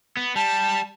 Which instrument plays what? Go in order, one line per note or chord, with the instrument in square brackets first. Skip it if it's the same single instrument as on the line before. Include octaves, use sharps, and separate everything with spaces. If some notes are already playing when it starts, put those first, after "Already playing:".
[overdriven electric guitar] B3
[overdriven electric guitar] G3 [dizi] A5